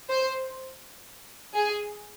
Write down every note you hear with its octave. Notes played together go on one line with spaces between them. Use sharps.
C5
G#4